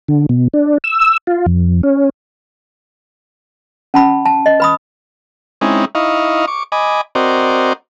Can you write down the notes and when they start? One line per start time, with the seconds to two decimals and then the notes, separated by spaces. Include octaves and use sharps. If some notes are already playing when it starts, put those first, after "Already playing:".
0.08 D3
0.29 B2
0.54 D4
0.84 E6
1.27 F4
1.46 F2
1.83 C#4
3.94 C#4 A5 B5
4.25 A5
4.46 D#5
4.60 B4 B5 D#6
5.61 G#3 C4 C#4 D#4 E4
5.95 D#4 E4 D#5 F5 C#6
6.47 C#6 D6
6.72 D#5 G#5 B5 D6
7.15 C4 F#4 A#4 C5 D5 D#5